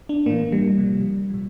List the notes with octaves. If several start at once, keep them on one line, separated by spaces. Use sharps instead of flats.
D4
A2 E3 A#3
G3
C3 F3
A#2 F3